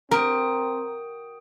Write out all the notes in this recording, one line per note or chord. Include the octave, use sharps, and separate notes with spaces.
C4 F#4 A#4 G5 A#5 D#6